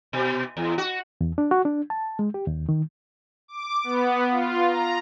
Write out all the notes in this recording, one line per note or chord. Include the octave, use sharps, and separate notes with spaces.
B2
E2
F#4
E2
D4
F#4
D4
A5
G#3
G4
D#2
D#3
D6
B3
F4
A#5